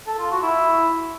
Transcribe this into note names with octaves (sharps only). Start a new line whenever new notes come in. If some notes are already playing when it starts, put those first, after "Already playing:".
A4
F4
F#4
E4